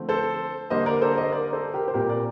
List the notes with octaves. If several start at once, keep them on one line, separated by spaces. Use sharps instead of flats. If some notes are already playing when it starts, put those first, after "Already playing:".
Already playing: D3 F3 A3 C4
A4 C5
D3 G3 A#3 C5 D#5
A#4 D5
A4 C5
C5 D#5
A#4 D5
A4 C5
G4 A#4
C5
A#2 G3 C4 G4 A#4
A#4 D5